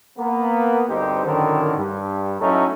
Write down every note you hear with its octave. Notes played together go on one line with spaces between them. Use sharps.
A#3 B3
D2 G2 C4 D#4 G4 C5
F#2 A2 D3 D#3
G2
A2 F#3 A3 C#4 D#4 E4